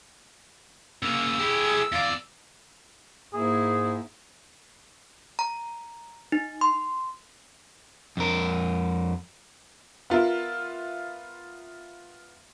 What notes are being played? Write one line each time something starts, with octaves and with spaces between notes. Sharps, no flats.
C#3 A#3 E6
E4 G4 G#4
E2 D5 F5
G#2 A#3 E4 G#4
A#5
D#4
C6
F2 A#4
B3 F4 A#4 E5